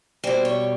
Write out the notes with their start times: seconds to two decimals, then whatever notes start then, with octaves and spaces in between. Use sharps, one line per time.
0.24 B2 G3 C5
0.45 C#5